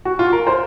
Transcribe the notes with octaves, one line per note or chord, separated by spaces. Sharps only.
F#4
F4
A#4
C5